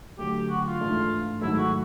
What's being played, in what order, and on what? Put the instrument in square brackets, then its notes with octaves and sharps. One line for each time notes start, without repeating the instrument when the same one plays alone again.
[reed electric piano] D3 F#3 A3 [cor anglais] G4
[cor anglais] F#4
F4
[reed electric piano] G#2 E3 A3 D4
[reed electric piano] G#2 D#3 F#3 A3 [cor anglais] E4
[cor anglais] F#4